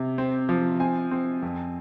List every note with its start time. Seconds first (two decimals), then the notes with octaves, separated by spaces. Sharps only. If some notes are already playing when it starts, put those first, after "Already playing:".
Already playing: C3
0.18 C4
0.49 F3
0.80 C4 G#5
1.11 C4
1.42 F2